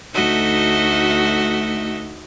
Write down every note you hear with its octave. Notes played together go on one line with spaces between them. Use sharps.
D2 A3 D#4 F#4 D#5 E5